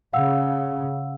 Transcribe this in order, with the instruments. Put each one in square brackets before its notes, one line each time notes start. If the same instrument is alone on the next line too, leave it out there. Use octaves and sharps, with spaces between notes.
[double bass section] C#3 [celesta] F5 F#5 E6